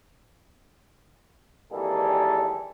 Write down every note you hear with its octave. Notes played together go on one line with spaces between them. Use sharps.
G#1 E3 G3 A#3 G#4 A4